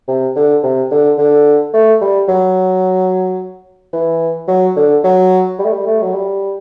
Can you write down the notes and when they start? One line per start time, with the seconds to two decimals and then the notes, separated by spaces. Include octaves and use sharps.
0.08 C3
0.36 D3
0.63 C3
0.91 D3
1.18 D3
1.74 A3
2.01 G3
2.28 F#3
3.93 E3
4.48 F#3
4.76 D3
5.04 F#3
5.59 G3
5.65 A3
5.73 G3
5.87 A3
6.03 F#3
6.14 G3